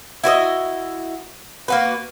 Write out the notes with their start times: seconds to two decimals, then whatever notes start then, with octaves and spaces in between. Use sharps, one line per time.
0.24 E4 F#4 B4 D#5
1.68 A#3 F#4 B4